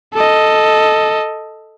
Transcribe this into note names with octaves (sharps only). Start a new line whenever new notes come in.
A4 D#5